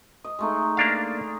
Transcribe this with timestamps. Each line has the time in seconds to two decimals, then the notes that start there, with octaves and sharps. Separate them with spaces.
0.24 D#5
0.39 G#3 A3 D#4
0.77 A#3 D4 F5